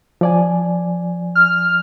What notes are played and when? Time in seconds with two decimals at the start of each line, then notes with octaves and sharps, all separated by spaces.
0.21 F3 D5 G#5
1.35 F6